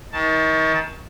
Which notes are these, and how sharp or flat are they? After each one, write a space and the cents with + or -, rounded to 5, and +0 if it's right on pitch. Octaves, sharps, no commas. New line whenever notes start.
D#3 +35 A5 +0